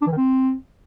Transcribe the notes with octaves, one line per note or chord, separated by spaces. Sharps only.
D4
E3
D#3
C4